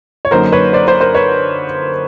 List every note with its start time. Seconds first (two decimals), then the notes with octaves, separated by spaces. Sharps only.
0.25 C#5
0.31 F#2 D3 F#3 A#3 D#4 A#4 C5
0.52 B4 C#5
0.73 C5 D5
0.88 C5 D5
1.01 A#4 C5
1.15 B4 C#5